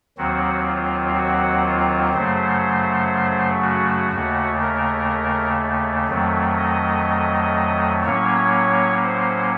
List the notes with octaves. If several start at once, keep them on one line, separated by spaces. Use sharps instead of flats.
D#2 D#3 F#3 C4 F#4
F4
F#4
F4
F#2 C#3 F#3 A3 C5
F#4
D#2 C#3 A3
A#4
F2 D#3 F#3 A3
D#5
A2 F#3 A#3 C#4 C#5
C5